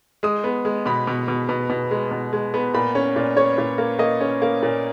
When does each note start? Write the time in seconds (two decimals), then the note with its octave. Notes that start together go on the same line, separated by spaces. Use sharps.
0.23 G#3 D#6
0.44 B3
0.65 G#3
0.86 B2 B5
1.07 B2
1.28 B2
1.49 B2
1.70 B2
1.91 G#3
2.11 B2
2.33 G#3
2.54 B3
2.74 A#2 B5
2.95 C#4
3.16 A#2
3.37 C#4 C#5
3.58 A#2
3.78 A#3
3.99 A#3 D#5
4.21 C#4
4.42 A#3
4.63 A#2